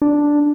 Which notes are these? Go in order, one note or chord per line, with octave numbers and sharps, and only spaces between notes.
D4